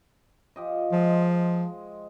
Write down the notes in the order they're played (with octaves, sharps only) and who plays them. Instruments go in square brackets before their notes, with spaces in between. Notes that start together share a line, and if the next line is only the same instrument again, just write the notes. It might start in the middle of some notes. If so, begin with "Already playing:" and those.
[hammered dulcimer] F3 G4 D#5
[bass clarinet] F3 [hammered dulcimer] G#3